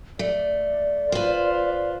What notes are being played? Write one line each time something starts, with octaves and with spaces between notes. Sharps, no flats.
A3 D5
F4 B4 C5